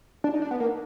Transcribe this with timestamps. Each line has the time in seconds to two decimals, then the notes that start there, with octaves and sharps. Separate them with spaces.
0.24 D4
0.34 D#4
0.42 D4
0.51 B3
0.60 A#3